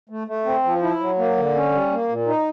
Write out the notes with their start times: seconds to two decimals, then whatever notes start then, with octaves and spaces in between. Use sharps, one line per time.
0.09 A3
0.27 A3
0.45 C4
0.64 F3
0.82 E4
1.00 F#3
1.18 A#3
1.37 D3
1.55 C#4
1.73 G3
1.91 A#3
2.09 A#2
2.27 D#4